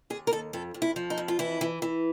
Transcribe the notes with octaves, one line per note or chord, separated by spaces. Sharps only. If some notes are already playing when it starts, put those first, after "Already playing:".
D#2 G#4
A#4
D#2 A4
F2 A4
F2
E4
F3
D#4
F2
F4
E3 E4
E3
E3